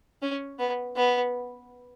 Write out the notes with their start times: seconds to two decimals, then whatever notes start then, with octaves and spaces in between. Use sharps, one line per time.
0.22 C#4
0.59 B3
0.96 B3